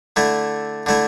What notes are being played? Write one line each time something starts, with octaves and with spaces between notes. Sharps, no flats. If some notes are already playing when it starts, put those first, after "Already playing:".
D3 A3 E4
D3 A3 E4